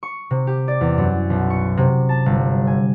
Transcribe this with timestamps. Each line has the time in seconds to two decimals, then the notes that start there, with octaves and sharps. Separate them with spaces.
0.03 C#6
0.31 C3
0.47 G4
0.68 D5
0.81 E2
0.98 F#2
1.30 B1
1.50 C#6
1.77 C3
2.09 A5
2.26 G1
2.67 G#5